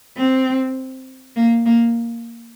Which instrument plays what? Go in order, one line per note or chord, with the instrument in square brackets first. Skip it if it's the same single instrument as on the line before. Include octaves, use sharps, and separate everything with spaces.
[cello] C4
A#3
A#3